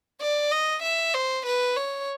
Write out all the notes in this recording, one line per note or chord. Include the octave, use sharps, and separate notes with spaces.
D5
D#5
E5
C5
B4
C#5